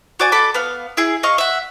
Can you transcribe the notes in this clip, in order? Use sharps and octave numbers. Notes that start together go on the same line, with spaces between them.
F#4 D5 G#5
A4 B5 D6
B3 F5
E4 G#4
D#5 F5 C#6
E5 F#5